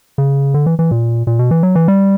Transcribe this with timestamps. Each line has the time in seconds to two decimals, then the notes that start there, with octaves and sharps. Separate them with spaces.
0.18 C#3
0.54 D3
0.66 E3
0.79 E3
0.91 A#2
1.27 A#2
1.39 B2
1.51 E3
1.63 F#3
1.75 E3
1.88 G3